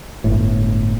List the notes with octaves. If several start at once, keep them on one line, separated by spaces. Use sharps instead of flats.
G1 A2